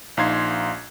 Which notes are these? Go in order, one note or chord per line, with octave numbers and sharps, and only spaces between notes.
A#1 D#4 F5 C6 G#6 C7